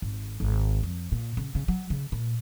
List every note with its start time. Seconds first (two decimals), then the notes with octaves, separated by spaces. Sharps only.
0.02 G#1
0.40 G#1
0.83 F2
1.12 A#2
1.37 C#3
1.55 C#3
1.68 F#3
1.90 C#3
2.12 A#2